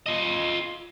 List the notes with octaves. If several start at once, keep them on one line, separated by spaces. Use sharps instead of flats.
F4 D#5